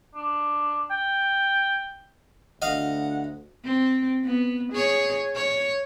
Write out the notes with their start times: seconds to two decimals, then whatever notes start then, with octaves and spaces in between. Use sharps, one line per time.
0.15 D4
0.91 G5
2.62 D2 D#5 F5 F#5
3.65 C4
4.25 B3
4.72 G#4 C#5
5.35 C#5